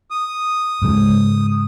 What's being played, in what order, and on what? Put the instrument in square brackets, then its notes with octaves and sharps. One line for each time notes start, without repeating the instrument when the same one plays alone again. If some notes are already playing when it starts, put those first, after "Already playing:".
[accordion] D#6
[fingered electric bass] G#2 C#3 G#3